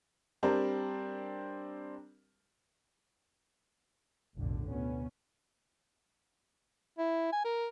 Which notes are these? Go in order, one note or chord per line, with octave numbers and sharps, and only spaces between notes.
G3 C4 D4 A#4
F1 B1 A2 D3
D2 B2 B3 C#4
E4
G#5
A#4